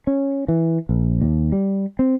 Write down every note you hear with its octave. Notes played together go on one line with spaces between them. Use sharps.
C#4
E3
A#1
D#2
G3
C4